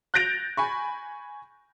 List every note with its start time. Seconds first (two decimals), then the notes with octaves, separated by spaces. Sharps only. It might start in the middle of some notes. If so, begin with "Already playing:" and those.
0.14 F#6 G6 A6 A#6 D7 F7
0.57 G#5 B5 C#6